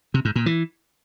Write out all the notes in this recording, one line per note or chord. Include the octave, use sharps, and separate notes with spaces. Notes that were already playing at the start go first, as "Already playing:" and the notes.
C3
G#2
A#2
E3